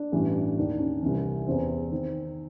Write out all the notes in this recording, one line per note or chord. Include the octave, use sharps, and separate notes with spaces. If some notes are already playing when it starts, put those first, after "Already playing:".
Already playing: D4
A1 G2 E3
D#2 D#3 D4
C#4
C2 C3 E3 C#4
E2 C#3 E3 C4
D#3 C4